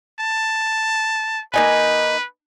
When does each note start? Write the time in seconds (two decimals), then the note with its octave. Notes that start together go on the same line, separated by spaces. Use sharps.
0.20 A5
1.54 A#3 D#4 B4 G#5